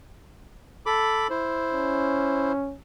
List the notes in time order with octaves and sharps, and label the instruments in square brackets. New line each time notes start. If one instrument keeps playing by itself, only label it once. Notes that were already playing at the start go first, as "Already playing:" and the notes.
[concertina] A4 B5 D6
E4 C5
[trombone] C#4